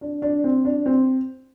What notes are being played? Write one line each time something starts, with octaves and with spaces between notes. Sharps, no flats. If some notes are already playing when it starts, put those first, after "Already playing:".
D4
D4
C4
D4
C4